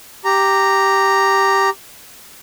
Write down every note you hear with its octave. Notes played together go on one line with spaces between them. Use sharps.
G4 A#5